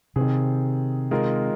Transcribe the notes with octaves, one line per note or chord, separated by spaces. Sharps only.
C3 D#3 C4 G#4
D#3 G#3 F4 A#4